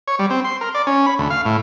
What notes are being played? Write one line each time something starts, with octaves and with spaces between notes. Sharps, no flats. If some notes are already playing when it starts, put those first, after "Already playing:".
C#5
G3
C4
C6
A#4
D5
C#4
B5
D2
F5
A2